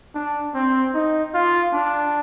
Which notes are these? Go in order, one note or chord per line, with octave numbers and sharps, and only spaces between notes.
D4
C4
D#4
F4
D4